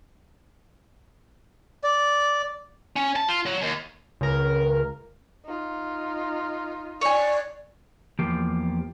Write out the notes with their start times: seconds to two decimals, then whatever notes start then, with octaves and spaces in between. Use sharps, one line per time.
1.84 D5
2.96 C#4
3.16 A5
3.28 F4
3.46 F#3
3.62 D#2
4.21 C#2 A#4
5.45 D#4 F4
7.01 C#5 D5 G#5
8.19 E2 F3 A#3 G4